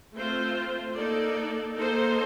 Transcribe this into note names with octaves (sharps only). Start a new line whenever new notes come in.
A3 C4 F4 C5
A#3 D#4 A4 D5
A#3 D#4 A4 C5